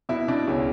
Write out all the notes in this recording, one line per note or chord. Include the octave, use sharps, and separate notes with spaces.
B2 E4
B2 D4
C#2 C#4